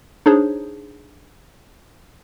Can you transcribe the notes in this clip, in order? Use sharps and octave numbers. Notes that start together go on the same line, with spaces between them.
D4 D#4 G#4 C5 C#5